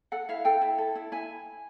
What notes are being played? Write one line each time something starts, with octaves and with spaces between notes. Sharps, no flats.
A4 F#5
E4 F5
A4 G5
E4
A4
E4
E4 G#5